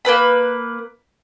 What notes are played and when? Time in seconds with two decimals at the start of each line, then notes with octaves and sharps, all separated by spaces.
0.05 A#3 C4 B4 B5